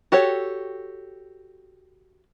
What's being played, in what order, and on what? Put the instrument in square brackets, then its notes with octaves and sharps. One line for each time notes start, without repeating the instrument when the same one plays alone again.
[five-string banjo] F#4 G4 A4 C#5